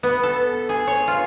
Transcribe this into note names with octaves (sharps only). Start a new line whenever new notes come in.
B3
A4
G#4
C#5
F4